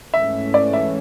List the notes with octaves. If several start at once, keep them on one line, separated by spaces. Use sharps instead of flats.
G#2 E3 A3 C#4 E5
D5
E5